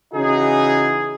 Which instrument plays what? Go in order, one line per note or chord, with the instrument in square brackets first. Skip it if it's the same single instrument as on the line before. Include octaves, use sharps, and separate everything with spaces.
[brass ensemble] C#3 E3 D#4 F#4 G#4